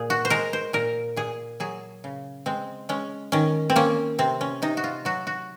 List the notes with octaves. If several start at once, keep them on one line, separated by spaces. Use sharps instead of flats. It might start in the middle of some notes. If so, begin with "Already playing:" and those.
Already playing: A#2 G#4
F#4
C5
G#3 A#4
C5
A#2 A#4
A#2 G#4
F#3 G#4
C#3
G#3 C4
G#3 C#4
D#3 C#4
C4
A#3 C#4
C3 C4
C#4
C3 D#4
F#4
F4
F#3 F#4
F#4